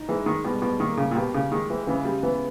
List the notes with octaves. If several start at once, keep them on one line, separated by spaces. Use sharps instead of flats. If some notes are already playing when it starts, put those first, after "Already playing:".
Already playing: D#4
E3 G#3
D#3
B2 G3
B2
D#3 A#3
C#3
A#2
B2 G4
C#3
D#3 G#3
E3
C#3 E3
G3
E3 B3